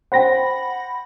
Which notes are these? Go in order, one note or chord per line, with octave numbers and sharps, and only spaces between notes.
C5 F#5 G5 B5 A#6